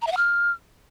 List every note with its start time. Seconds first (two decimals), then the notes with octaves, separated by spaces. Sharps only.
0.02 A#5
0.07 E5
0.12 F#5
0.17 F6